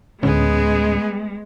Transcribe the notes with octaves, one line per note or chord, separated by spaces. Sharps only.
D2 A2 G#3 B3 C#4 G#4